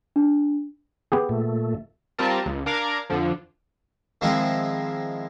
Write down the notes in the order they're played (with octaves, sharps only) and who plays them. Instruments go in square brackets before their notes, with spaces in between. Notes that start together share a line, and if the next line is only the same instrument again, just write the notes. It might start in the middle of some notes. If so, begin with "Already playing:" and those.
[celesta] D4
[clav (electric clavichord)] B3 G4 G#4
[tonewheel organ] A#2 A3
[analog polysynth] G3 C4 F4 A#4 A5
C#2
D4 A#4 F5 A#5 D6 G#6
F2 D3 F3
[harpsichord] D#3 F3 G#3 C4 E4